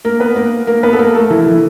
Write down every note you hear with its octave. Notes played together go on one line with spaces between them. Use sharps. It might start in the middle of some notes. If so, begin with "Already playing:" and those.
A#3 A#4
B3 B4
A#3 A#4
A#3 A#4
B3 B4
A4
A#3 A#4
A3 A4
E3 E4
E3 E4